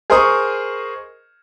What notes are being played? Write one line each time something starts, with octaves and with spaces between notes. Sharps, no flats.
G#4 A#4 C5 D#5 C#6 D#6